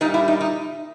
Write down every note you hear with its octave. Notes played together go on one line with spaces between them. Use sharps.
A#2 G3 D#4
E4
D#4
D#4